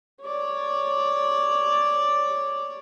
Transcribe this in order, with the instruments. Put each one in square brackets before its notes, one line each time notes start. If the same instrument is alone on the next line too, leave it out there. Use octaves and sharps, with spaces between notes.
[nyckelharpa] C#5 D5